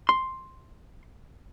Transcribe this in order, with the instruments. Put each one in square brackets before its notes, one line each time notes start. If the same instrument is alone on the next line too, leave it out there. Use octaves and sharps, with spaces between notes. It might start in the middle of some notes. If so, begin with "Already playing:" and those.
[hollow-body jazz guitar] C6